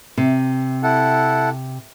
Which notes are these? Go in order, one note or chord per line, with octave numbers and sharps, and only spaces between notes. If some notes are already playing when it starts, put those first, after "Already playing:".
C3
E4 A4 F#5